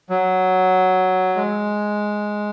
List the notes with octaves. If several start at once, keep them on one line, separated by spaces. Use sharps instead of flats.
F#3
G#3